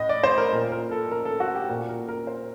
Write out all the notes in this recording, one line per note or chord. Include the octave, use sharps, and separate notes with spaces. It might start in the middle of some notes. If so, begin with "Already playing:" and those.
Already playing: A2 D#5
D5
C5
A#4
A#2 A#4
A#4
A4
A#4
A4
F#4
G4
A#2 A#4
A#4
A#4
C5